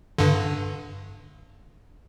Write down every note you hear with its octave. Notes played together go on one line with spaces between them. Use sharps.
G2 D3